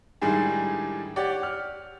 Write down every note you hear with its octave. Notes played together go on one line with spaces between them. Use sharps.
A2 D#3 G3 G#3 D4 G#4
G4 C#5 D5 F#5
F6